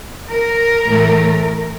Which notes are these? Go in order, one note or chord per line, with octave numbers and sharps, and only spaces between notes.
A#4
A2 E3 A3